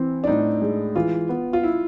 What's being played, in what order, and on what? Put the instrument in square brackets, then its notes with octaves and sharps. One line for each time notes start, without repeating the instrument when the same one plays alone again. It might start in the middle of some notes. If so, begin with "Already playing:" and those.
Already playing: [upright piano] E3 C4 [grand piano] E4
[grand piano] D4
[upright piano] A2 [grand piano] D#4
[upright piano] G#3
[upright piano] E3 [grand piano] F4
[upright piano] B3
[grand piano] F4
E4